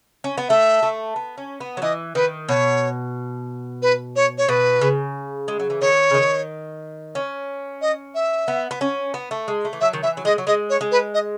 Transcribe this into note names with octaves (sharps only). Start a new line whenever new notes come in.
C#4
B3
A3 E5
A3
B3
C#4
B3
F#3
E3 D#5
D#3 B4
B2 C#5
B4
C#5
C#5
B2 B4
C#3
G#3
F#3
E3
D#3 C#5
C#3
D#3
C#4
D#5
E5
B3
B3
C#4
B3
A3
G#3
A3
E3
F#3 E5
D#3
E3 E5
F#3
G#3 D#5
F#3
G#3 D#5
C#5
G#3
B4
D#5